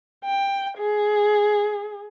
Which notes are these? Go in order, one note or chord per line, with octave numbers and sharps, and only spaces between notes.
G5
G#4